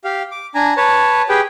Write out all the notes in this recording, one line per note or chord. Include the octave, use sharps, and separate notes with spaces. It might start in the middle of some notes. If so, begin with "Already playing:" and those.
G4 F5
D6
D4 G#5 A#5
B4 C#5 A5
G4 G#4 B4 G5